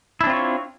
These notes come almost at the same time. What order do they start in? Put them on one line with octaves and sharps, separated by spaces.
E4 D4 C4 F4 C#5